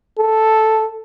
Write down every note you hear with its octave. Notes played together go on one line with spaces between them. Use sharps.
A4